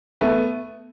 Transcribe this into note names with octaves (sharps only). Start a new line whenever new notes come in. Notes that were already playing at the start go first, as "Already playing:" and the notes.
A3 B3